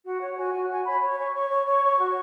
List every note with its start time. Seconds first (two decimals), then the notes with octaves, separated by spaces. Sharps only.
0.04 F#4 F#5
0.20 C#5
0.36 F#4 G#5
0.53 F#4
0.69 F#4 G#5
0.84 C#5 B5
1.01 C#5
1.18 C#5 C#6
1.33 C#5 C#6
1.50 C#5
1.65 C#5
1.82 C#5
1.98 F#4